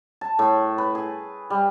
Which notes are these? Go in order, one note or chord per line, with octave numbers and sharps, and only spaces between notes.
A5
A2
B4
G#4
G3